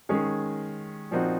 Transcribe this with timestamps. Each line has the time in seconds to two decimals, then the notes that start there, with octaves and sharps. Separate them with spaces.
0.09 D#3 G#3 C#4 G#4
1.11 A#2 F3 C4 D#4 F#4